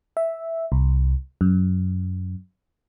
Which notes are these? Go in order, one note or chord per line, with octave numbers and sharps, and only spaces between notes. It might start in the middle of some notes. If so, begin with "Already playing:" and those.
E5
C2
F#2